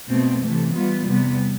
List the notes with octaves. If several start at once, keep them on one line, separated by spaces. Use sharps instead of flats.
B2 A3 C4
C3 E3 A3
E3 G3 B3 F4
E2 C3 G3 B3